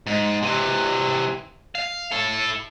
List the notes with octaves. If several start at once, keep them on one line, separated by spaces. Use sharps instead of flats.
G#2
C3 E3
F5
E4 A4